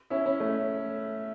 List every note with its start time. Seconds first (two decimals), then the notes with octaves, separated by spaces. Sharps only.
0.10 C#4 E4
0.26 C#4 E4
0.40 A3